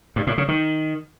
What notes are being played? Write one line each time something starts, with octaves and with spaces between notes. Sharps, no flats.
G2
A2
C#3
D#3